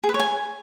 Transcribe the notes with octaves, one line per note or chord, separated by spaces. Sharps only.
G#4
B4
C#5
G#5